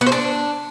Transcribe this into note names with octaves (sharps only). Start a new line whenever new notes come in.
B3
C5
D4